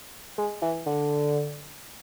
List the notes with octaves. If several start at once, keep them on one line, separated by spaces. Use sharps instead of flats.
G#3
E3
D3